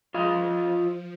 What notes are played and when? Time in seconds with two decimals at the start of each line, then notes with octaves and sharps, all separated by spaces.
0.14 F3 F4 D#5 F5